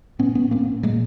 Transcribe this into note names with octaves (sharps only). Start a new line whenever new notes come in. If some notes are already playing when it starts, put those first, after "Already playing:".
A2 B3 C#4
B3 C#4
A2 A#3 C4
A#2 G#3 A#3